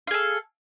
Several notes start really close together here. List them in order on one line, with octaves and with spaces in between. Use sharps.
F5 G#4 A4